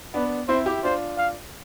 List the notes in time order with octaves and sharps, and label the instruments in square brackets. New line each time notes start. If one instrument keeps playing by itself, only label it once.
[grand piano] B3 D4 [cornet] B4
[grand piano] C4 E4 [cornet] C5
[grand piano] E4 G4
[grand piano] D4 F4 [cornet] C5
[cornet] F5